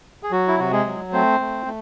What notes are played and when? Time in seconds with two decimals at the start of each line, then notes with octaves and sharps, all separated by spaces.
0.23 G#4
0.31 F#3 F#4
0.48 E4
0.59 C3 F#4
0.72 G#3 G#4
0.86 F#3
1.13 A3 C4 C5
1.40 A3
1.66 A3